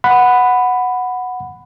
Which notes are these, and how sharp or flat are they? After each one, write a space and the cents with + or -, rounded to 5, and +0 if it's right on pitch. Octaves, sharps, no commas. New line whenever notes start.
F#5 -5 B5 +10